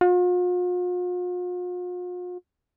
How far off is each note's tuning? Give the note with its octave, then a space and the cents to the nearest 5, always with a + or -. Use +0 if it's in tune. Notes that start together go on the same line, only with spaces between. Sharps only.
F4 +45